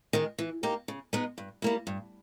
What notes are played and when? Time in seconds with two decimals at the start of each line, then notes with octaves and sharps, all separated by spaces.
0.13 D#3 G#3
0.38 E3
0.63 A#3 D#4 G4
0.88 C#3
1.13 G#3 B3 D#4
1.38 G2
1.62 G3 A#3 E4
1.87 G2